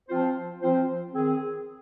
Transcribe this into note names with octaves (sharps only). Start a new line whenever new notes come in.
F3 C4 F4 C5
F3 C4 F4 C5
D#3 C4 G#4